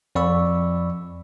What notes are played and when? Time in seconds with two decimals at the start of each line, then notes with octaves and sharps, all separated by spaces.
0.15 F2 D5 B5 C#6 E6